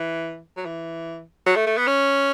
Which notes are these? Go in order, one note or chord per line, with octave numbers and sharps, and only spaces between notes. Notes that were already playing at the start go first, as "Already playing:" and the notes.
Already playing: E3
F#3
E3
F#3
A3
A3
B3
C#4